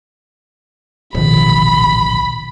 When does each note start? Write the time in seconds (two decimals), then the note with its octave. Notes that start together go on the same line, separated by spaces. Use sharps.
1.15 D1 A#1 B2 D#3 B5